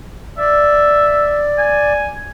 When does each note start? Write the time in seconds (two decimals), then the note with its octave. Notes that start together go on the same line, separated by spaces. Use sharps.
0.38 D5 E5
1.58 G#5